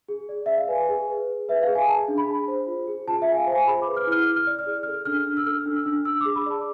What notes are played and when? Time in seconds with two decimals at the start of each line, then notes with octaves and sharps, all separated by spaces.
0.09 G#4
0.29 D5
0.46 D5 E5
0.57 F5
0.68 B4 G#5
0.89 G#4
1.08 B4
1.28 G#4
1.49 B4 E5
1.62 G#4 F5
1.75 G#5
1.87 G#4 A5
2.08 D4
2.18 B5
2.28 G#4
2.48 C5
2.67 F4
2.87 G#4
3.07 F4 A5
3.22 E5
3.27 F4 G#5
3.37 F5
3.47 C5
3.52 G#5
3.67 G#4 B5
3.82 D6
3.87 B4
3.96 F6
4.07 E4 F6
4.26 E4
4.36 F6
4.47 D5
4.59 F6
4.66 G#4
4.83 A4 F6
5.05 D4 F6
5.27 D4
5.37 E6
5.46 A4 F6
5.66 D4
5.76 E6
5.86 D4
6.05 D4 E6
6.21 D6
6.25 G#4
6.36 B5
6.46 D5 A5